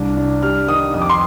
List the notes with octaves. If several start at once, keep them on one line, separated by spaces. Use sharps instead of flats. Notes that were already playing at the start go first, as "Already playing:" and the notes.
Already playing: C2 D4
D4
G3 F6
D#3 D#6
F2 D#6
D6
C6